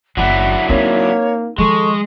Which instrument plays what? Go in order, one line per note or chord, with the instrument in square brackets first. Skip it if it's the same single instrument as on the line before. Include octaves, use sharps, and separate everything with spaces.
[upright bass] F#1 D#3 [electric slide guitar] F#3 D4 E4 [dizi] F#5
[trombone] A#3 [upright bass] C4 D#4 [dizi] C#5
[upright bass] D#3 F3 [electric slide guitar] G#3 [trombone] A4 [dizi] C#6